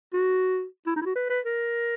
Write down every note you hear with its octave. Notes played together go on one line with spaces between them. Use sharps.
F#4
E4
D#4
E4
F#4
B4
B4
A#4